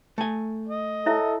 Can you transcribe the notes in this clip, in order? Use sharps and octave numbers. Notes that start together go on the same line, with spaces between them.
A3 G#5
D#5
E4 A4 C#5 E5